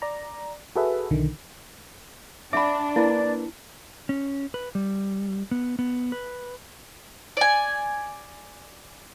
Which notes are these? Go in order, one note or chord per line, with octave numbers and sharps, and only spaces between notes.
D5 A#5
F#4 G#4 A4 B4 E5
B1 D3 D#3
D4 E5 F#5 B5 D6
A#3 E4 B4 D5
C#4
B4
G3
B3
B3
B4
D5 G#5